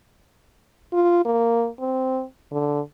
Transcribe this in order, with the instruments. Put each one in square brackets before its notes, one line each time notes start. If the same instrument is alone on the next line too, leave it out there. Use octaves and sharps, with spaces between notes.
[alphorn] F4
A#3
C4
D3